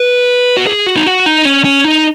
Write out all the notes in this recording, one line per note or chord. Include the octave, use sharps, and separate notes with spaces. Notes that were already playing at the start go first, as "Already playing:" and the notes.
Already playing: B4
F#4
G#4
F#4
D#4
F#4
D#4
C#4
C#4
D#4